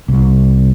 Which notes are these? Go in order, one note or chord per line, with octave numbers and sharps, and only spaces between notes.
C2